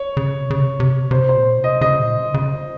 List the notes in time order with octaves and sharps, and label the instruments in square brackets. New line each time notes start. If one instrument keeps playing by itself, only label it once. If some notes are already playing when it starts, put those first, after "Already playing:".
Already playing: [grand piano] C#5
[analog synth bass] C#3
C3
C#3
C3
C#3
C3
[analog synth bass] C3 [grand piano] C5
[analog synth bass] A#2 [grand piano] C5
[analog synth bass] C3
[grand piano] D#5
[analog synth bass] C#3 [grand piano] D#5
[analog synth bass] A#2
C#3
C#3